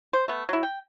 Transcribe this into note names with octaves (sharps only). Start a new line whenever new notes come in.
C5
A3 B3
F#3 E4
G5